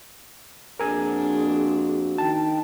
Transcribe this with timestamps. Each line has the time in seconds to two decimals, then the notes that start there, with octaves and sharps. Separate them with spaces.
0.80 F2 A#3 D4 F#4 G#4 A#4 G#5
2.18 D#3 D#4 G5 A5